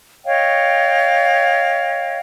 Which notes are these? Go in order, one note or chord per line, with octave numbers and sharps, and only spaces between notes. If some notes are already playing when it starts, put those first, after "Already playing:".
C#5 D#5 F5 G5